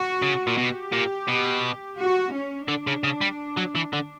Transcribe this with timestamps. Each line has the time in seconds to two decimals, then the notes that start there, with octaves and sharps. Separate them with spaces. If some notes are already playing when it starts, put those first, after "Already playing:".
Already playing: F#4
0.22 C#3
0.47 A#2
0.57 B2 G4
0.92 A#2
1.28 B2
1.99 F#4
2.34 C#4
2.68 D3 D4
2.87 C#3
3.04 C#3
3.21 G3
3.57 F#3
3.75 E3
3.93 D3